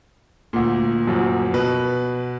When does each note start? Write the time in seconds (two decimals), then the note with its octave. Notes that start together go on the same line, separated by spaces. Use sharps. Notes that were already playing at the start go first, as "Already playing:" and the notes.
0.53 D2 A#2
1.07 F#2 F3 F#3
1.54 B2 B4